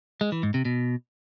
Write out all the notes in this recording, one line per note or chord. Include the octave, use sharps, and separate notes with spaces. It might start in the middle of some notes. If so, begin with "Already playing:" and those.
G#3
E3
G#2
C3
B2